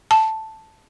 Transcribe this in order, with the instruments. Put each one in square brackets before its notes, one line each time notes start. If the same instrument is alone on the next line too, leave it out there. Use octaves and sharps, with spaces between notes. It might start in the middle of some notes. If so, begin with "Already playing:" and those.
[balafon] A5